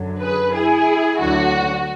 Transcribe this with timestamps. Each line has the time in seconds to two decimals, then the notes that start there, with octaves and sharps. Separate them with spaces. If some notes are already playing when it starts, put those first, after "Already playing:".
Already playing: F#2 D3 F#3
0.21 G#4 B4
0.55 E4 G#4
1.20 D2 D3 F#3 F#4